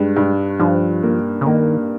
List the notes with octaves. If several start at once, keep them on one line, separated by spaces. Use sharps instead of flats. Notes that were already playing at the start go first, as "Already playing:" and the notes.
Already playing: G2 G#3
G2
G2 F3
A#3
C#3
D#3 A#3